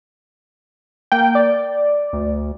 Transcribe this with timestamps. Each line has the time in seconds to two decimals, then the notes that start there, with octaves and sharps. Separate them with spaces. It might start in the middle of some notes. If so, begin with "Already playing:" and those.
1.12 A#3 G5
1.35 D5
2.13 D2